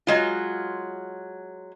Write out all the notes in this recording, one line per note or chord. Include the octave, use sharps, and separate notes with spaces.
F#3 G#3 F4